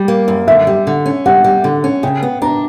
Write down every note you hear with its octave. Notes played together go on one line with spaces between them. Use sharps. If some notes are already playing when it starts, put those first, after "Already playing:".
Already playing: G3
A#3
F#2
D3 E5
G3
D3
C#4
G3 F#5
G3
D3
C#4
C#3 G5
B3
D4 A#5